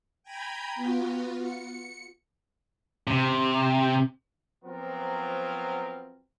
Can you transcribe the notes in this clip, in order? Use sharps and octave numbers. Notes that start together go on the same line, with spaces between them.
G5 G#5 A#5 B5 G6 G#6
B3 F4 F#4
C#7
C3
F3 F#3 B3 C4 F4 A#4